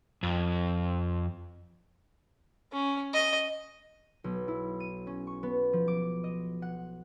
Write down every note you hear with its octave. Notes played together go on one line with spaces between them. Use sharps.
F2
C#4
D#5
B1
E4
D#7
C#4
C#6
B3
F3
D6
D#5
F#5